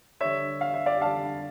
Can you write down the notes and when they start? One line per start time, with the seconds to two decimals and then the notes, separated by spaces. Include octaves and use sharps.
0.20 D3 G3 D4 C#5 E5
0.61 F5
0.74 E5
0.86 D5 F5
1.01 D3 G3 D4 F5 A5